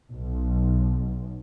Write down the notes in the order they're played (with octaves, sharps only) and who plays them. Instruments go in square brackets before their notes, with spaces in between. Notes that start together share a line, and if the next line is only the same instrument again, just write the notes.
[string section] B1